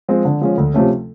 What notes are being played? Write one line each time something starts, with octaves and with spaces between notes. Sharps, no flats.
F3 G#3 C4
D3
F3 G#3 C#4
D2
C3 F3 A3 C#4